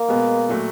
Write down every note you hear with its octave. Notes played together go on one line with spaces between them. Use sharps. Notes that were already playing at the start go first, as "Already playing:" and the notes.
Already playing: A#3
B2 G#3 B3
A#2 F#3 A3